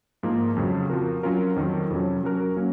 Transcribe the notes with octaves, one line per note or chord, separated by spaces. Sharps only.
G#2 F3 A#3 D#4
F2 C#3 F#3
F3 C4 F#4 A#4
F#3 C#4 F4 A#4
F2 D#3 F#3 C4
F2 C3 F#3 C#4
F#3 C#4 F#4 A#4
F#3 A#3 C#4